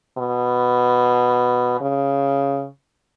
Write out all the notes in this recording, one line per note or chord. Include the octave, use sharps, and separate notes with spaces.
B2
C#3